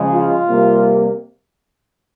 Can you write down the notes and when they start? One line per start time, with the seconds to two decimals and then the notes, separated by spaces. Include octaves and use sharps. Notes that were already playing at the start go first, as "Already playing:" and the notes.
Already playing: C#3 F3 G#3
0.11 F4
0.48 C3 G3 A#3